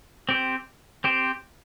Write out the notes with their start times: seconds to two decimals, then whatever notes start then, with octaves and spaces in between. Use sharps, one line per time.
0.29 C4 G4 C5
1.04 C4 G4 C5